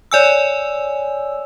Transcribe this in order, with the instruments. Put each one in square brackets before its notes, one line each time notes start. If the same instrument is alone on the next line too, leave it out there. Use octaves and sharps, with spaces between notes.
[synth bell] C#5 D5 G#5 E6